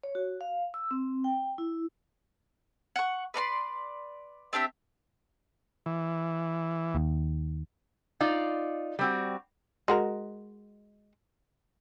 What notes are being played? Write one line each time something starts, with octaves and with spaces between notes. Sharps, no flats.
C#5
F#4
F5
E6
C4
G5
E4
F#5 C#6
B4 D5 A#5 C6
C4 D4 G4 E5
E3
D#2
D#4 F4 D5
G3 C4 F#4
G#3 F#4 A#4